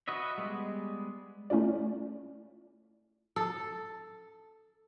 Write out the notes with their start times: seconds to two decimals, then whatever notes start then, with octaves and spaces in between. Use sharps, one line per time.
0.08 F#4 B4 D#5 E5
0.38 G3 G#3 B3
1.50 A3 C#4 E4 F4 D5
3.36 A4